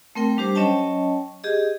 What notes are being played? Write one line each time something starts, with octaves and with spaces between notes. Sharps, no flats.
A3 C4 A#4 G5
G3 D4 G4 C5
F#3 C#4 C#5 D#5 G5 A5
G4 G#4 D#5